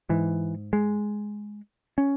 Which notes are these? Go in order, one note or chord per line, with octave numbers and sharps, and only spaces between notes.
G#2 E3
G#3
C#4